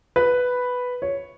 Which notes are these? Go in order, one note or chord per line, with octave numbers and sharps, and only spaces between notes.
B4
C#5